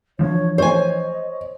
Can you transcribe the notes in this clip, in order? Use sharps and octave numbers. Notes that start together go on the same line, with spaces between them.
E3 F3 D4 C#5
C5 C#5 D#5 G#5